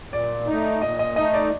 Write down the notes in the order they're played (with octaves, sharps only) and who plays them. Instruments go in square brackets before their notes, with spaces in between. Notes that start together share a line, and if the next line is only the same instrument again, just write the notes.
[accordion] A#2 [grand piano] D5
[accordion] A3 D#4
[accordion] A#2 [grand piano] D#5
[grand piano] D#5
[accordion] A3 D#4 [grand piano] D#5
[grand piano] D5